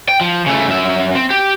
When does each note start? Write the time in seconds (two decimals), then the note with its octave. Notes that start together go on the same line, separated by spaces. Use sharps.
0.09 G5
0.21 F3
0.46 C#3 A3
0.68 F#2 E5
1.15 C4
1.30 G4